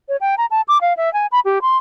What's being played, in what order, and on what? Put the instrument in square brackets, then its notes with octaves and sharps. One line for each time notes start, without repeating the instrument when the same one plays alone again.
[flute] C#5
G5
A#5
A5
D6
F5
E5
G#5
B5
G4
C6